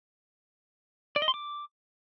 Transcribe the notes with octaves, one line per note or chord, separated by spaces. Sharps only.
D5
D#5
C6
D6